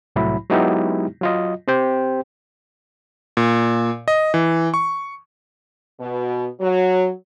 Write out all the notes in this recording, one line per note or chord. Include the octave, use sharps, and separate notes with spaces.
C2 A2 F#3 E4 B5
F#3 G#3 B3 D#4 E4 G4
F#3 F4 D#5
C4 G4 C5 G5
A#2
D#5
E3
C#6
B2
F#3